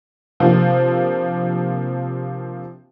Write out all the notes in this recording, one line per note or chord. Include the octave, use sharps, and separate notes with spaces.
C3 F3 A#3 C4 D4